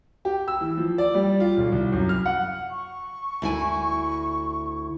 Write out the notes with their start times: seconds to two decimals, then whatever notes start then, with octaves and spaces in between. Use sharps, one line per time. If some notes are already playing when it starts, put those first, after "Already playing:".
0.25 G4
0.48 E6
0.61 E3
0.77 F3
0.98 D5
1.14 G3
1.40 F4
1.57 B1
1.72 C2
1.92 F#2
2.09 F6
2.26 F#5
2.71 C#6
3.42 D2 E4 G#5